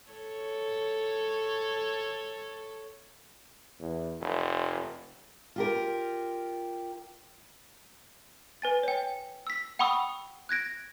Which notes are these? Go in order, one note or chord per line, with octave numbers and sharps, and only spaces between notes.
A4 C#5
E2
F1
F4 G4 A#4
B4 G#5 A6
C#5 G5
E6 B6
F#5 G5 B5 C#6 D#6 E6
F#6 G#6 A#6 D7